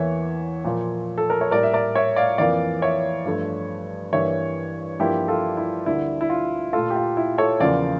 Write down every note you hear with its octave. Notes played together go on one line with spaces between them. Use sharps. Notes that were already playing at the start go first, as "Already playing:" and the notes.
Already playing: E2 E3 A#3 C#5 E5
A#2 F3 A#3
A4
A#4
C#5
A2 G3 A#3 A#4 D5
E5
A#4 D5
C#5 E5
D5 F5
F2 E3 A#3 D5 F5
C#5 E5
G2 F3 A3
G2 E3 G3 A#3 C#5 E5
G2 F3 A#3 E4 G4
F4 A4
E4
D2 D3 G3 A#3 E4
E4
F4
A#2 A3 F4 A4
G4
F4
E4
A4 C#5
E2 C#3 F3 A#3 D5 F5